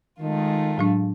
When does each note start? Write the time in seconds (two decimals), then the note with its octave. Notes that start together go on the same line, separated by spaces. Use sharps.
0.20 D#3 G#3 A3 F4
0.78 A2 F#3 D4